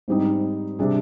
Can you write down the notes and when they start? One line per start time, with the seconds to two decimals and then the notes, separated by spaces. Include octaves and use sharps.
0.08 G#2 G3 C4 D#4
0.79 C3 G3 D4 G#4